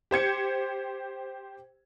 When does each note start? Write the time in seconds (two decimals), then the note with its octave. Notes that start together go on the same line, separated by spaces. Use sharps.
0.11 G4 C5 G#6 C#7